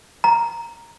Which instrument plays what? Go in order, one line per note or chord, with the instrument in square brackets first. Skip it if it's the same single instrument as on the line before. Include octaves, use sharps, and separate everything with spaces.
[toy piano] A#5